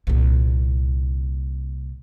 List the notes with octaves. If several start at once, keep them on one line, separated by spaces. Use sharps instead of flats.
C2 A#2